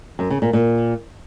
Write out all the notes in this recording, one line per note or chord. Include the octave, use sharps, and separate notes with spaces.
F#2
C#3
A#2
A#2